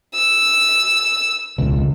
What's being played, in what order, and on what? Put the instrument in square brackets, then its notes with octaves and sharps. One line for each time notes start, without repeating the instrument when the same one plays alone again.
[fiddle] E6
[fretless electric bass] E1 C#2